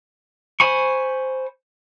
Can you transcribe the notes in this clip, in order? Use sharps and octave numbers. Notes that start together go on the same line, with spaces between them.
C5 G#5 B5 C#6